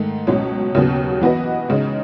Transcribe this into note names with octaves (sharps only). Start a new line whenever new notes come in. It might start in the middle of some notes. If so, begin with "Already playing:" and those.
Already playing: G#2 D#3 A3
C#2 B2 F#3 C#4
D#2 C#3 F#3 B3
E3 B3 F#4 B4 D#5
C#2 C#3 G#3 D#4